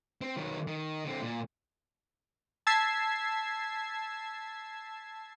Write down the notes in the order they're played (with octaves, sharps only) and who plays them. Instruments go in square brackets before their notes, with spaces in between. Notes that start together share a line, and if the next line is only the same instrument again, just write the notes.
[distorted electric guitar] C4
D#3 F#3
D#3
D3 C4
A#2
[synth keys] A5 E6 G#6 B6 C7